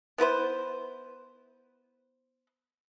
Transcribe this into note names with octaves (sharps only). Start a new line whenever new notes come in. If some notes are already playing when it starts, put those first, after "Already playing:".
B3 E4 B4 C5